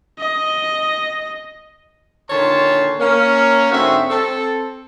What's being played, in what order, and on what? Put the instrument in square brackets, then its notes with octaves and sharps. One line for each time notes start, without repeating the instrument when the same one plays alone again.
[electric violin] D#5
[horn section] A#2 D3 D#3 C#5 A5 C6
A#3 C#4
G#2 D3 C4 F#4 G#4 E5
C4 A4